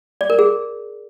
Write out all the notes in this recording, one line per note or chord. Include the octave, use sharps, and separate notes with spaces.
D5
A#4
G#4